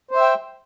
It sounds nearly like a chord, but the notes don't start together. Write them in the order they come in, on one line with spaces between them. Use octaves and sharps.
C5 E5 G5